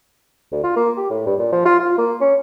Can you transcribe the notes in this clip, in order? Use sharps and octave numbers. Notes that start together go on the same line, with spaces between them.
D2
F4
A#3
G4
A2
G2
A#2
F3
F4
F4
A#3
C#4